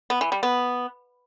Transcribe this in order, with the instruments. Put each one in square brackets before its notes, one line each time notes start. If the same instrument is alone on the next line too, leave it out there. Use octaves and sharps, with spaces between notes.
[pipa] B3
E3
G3
B3